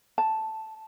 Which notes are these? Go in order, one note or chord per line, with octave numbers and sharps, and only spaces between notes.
A5